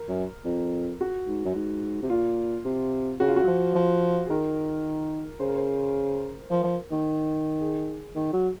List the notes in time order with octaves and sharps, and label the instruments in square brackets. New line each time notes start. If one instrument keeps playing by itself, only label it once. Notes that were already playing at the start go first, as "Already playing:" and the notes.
Already playing: [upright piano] A#4
[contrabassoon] F#2
F2
[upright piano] F#4
[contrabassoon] G#2
F#2
G#2
C3
[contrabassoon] A#2 [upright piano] F4
[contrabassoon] C3
[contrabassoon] C#3 [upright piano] F#4
[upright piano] F4
F#4
[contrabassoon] F#3
F3
F3
[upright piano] G#4
[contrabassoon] D#3 [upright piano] A#4
[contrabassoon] C#3 [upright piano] C5
[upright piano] A#4
C5
[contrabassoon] F3 [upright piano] A#4
[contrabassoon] F3
D#3
[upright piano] G#4
[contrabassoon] D#3
F#3